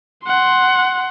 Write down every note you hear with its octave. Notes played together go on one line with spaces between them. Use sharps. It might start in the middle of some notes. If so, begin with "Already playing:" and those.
F#5 C6